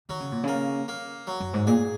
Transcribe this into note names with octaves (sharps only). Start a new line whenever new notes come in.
D#3 F#3
C#3
A#2
C#3 A#3
A#3
F#3
F#2
G#2
A#2 G#4